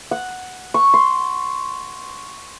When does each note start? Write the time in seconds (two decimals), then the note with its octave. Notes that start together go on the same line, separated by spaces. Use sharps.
0.11 F#5
0.74 C#6
0.94 C6